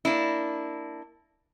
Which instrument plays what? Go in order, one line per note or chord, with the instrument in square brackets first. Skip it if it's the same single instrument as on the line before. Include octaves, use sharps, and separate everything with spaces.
[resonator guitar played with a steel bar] A#3 D4 E4